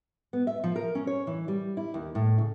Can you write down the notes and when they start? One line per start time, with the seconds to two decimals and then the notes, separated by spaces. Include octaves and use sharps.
0.33 B3
0.47 E5
0.64 F3
0.76 A#4
0.95 C#4
1.07 C#5
1.27 E3
1.48 G3
1.77 E4
1.94 D#2
2.15 A2
2.38 C#3